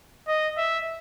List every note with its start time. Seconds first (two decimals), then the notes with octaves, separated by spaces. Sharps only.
0.28 D#5
0.57 E5